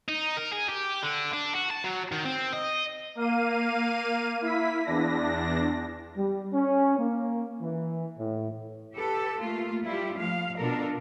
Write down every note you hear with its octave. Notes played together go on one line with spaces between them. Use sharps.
D#4
A#4
G#4
G4
D3
D4
F#4
A5
F#3
D#3
C4
D#5
A#3 F5 D#7
E4 B6
E2 D4 A#6
G3
C#4
A#3
E3
A2
G4 A4 B4
A3 A#3 F4
G3 E4 F4 G4
F3 A3 F5
B2 D4 F4 A4 A#4